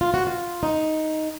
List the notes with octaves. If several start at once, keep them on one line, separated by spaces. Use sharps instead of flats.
F4
F#4
F4
D#4